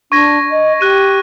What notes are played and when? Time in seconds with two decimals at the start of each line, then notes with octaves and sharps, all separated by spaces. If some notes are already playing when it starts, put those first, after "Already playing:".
0.12 D4 C#6 G#6 A#6
0.51 D#5
0.81 G4 F#6 D#7